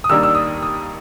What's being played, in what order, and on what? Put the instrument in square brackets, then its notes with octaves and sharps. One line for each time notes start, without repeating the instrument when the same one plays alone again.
[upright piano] D#6
D#2 D#3 G3 A#3 D4 E6
E6
D#6
D#6